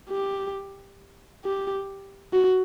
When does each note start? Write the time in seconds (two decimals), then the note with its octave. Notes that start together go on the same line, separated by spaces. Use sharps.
0.10 G4
1.44 G4
2.33 F#4